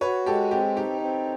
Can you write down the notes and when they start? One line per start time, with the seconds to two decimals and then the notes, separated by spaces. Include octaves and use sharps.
0.01 F#4 B4 C#5
0.26 G#3 G4 A4
0.51 C4 G4
0.76 D#4 G4
1.01 C4